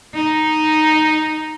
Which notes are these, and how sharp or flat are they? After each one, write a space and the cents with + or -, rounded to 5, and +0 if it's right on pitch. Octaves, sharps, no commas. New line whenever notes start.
D#4 +0